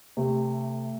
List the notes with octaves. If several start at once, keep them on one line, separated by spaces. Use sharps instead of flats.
C3 A3